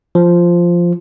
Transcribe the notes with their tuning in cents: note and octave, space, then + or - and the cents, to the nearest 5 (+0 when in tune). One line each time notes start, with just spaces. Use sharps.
F3 -5